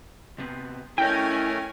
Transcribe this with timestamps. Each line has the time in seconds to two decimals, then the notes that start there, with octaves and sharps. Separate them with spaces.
0.38 C3 B3 C4
0.98 A3 C#4 E4 A4 A#4 D#5 G5 G#5